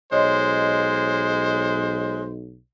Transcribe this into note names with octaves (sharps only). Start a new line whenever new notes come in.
B1 G#3 C5 C#5 D#5 C6